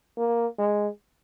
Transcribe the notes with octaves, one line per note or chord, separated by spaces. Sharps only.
A#3
G#3